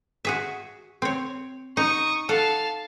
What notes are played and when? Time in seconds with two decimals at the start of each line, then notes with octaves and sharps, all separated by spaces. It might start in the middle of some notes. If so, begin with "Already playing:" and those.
0.25 F#4 G#4 E5
1.02 C4 C#5
1.77 D#4 C#6 D#6
2.29 A4 F5 F#5 A5